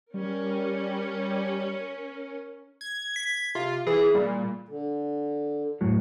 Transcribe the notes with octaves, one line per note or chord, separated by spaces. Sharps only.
G3 C#4 A#4
G#6
B6
C3 F4
E3 G#4
A#2 G3
D3
F#2 A2 F#3